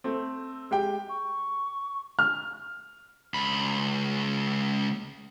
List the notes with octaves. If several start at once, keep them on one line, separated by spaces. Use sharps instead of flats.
A3 C4
G#3 G4 G5
C#6
F6
C#2 B5